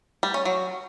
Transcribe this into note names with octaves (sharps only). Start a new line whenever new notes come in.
G3
C#4
F#3